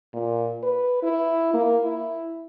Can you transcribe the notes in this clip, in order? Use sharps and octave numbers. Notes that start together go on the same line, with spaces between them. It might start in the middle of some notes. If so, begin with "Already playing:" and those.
A#2
B4
E4
A#3
E4